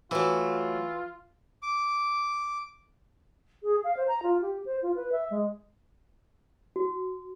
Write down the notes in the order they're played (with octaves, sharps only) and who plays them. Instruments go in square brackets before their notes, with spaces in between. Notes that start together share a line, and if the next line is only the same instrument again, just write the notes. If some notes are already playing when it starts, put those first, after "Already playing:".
[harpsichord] E3 [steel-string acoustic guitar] F#3 A3 [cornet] F4
[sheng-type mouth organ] D6
[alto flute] G#4
F5
C5
A#5
F4
G4
C5
F4
B4
E5
G#3
[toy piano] F#4